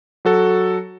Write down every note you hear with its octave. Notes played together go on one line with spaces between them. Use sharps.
F#3 F#4 A4